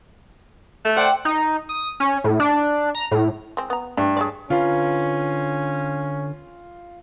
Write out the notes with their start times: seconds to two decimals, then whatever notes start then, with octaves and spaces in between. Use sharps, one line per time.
0.85 A3
0.97 C5 D5 F#5 G5
1.25 D#4
1.69 D#6
2.00 C#4
2.24 A2
2.40 D4
2.95 A#5
3.11 A2
3.57 G#3 C4
3.70 B3 A#5
3.97 G2 E3
4.17 G#4 C#5 D5
4.50 D3 C#4 F4 B4 A#5